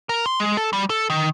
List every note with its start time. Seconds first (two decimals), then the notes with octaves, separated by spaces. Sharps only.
0.09 A#4
0.26 C6
0.40 G#3
0.57 A4
0.73 G3
0.90 A4
1.10 D#3